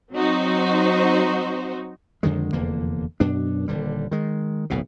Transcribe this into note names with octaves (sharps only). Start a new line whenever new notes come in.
F#3 C4 D#4 F#4 C5
F2 D3 D#3 G#3
F1 E2 D3 A#3
F#2 B2 D4
D#1 D3 G3
D#3 G#3
D1 B1 B2